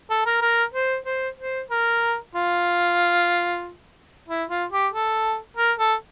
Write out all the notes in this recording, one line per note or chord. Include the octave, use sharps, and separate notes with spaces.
A4
A#4
A#4
C5
C5
C5
A#4
F4
E4
F4
G4
A4
A#4
A4